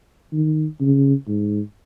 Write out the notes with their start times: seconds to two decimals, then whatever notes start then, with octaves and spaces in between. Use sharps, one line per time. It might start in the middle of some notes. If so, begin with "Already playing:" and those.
0.33 D#3
0.81 C#3
1.27 G#2